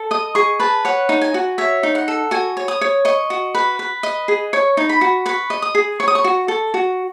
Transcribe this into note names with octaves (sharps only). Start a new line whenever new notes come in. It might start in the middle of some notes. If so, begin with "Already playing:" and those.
Already playing: A4
D#5 D#6
G#4 C#6
B4 A5
C#5 F#5
D#4
G#5
F#4
C#5 E5
D#4
F#5
A4
F#4 G#5
C#5
D#6
C#5
D#5 C#6
F#4
B4
B4
D#5
G#4
C#5 C#6
D#4
B5
F#4
B4 C#6
D#5
D#6
G#4
C#5 C#6
D#6
C#6
F#4
A4
F#4